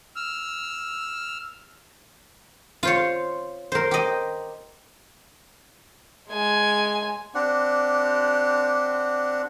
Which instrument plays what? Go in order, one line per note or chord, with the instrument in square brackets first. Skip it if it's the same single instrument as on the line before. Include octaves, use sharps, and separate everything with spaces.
[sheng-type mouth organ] E6 F6
[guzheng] F4 C5 C#5
A#4 C5
G4 D#5
[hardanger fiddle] G#3 G#5
[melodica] C4 D4 G4 F#5